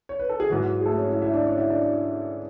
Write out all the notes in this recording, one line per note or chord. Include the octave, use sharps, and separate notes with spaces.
C#5
B4
A4
G#4
G#2 E3 F#3 F#4
F#3 F#4
G#4
A3 A4
C#4 C#5
E4 E5
E4 E5
D4 D5
C#4 C#5
E4 E5
D4 D5
D4